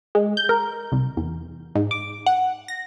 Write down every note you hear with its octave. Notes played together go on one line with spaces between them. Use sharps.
G#3
G6
A#4
C2
E2
G#2
D6
F#5
A#6